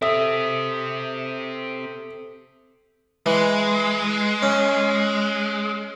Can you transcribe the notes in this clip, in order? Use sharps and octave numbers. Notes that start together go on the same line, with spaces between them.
C4 G4 A4 E5 D#6
E3 G#3
C#4